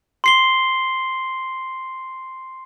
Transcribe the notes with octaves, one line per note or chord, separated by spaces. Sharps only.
C6 C7 G7